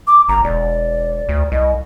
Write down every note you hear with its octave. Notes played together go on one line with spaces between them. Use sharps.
D6
G1 A#5
E1 D5
D2
C2 D#5